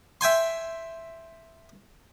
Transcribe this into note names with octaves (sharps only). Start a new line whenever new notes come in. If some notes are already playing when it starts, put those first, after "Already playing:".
E5 G5 G#5 C6